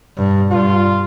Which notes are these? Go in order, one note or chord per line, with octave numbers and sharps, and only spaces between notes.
G2
G2 F4